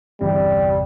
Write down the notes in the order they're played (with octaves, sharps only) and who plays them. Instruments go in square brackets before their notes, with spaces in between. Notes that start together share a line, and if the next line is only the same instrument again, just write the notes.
[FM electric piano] G1 E2 C3 [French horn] G3